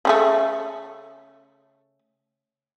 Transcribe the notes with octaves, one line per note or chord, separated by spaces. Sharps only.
C#3 G3 A3